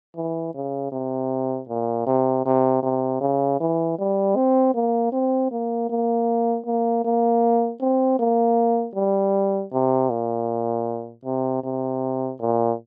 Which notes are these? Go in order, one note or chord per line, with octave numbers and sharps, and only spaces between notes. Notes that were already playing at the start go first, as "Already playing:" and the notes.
E3
C#3
C3
A#2
C3
C3
C3
C#3
E3
G3
C4
A#3
C4
A#3
A#3
A#3
A#3
C4
A#3
G3
C3
A#2
C3
C3
A#2